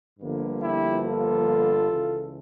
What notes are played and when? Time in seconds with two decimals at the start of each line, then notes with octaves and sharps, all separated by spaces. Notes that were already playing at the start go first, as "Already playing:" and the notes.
0.19 G1 G2 D3 F3 A#3
0.62 E4 G4
1.04 F4 A4
1.91 C#2 C#3 E3